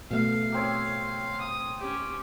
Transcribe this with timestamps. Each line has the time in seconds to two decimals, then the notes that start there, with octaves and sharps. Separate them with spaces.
0.11 B2 A3 F5
0.52 A#3 C4 C#5
1.41 D#6
1.78 C#4 G4